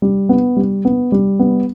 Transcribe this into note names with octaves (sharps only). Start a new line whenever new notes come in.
G3
B3
G3
B3
G3
B3